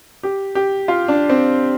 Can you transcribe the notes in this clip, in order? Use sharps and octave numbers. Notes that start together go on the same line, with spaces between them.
G4
G4
F4
D4
C4